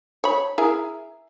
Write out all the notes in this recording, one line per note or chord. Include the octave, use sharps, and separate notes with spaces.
C#5 B5
E4 G#4 A#4